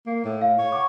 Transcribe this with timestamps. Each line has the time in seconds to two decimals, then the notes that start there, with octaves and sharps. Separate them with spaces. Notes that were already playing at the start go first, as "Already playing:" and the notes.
0.06 A#3
0.24 A2
0.41 F5
0.58 C#5
0.72 F#5 C#6 D6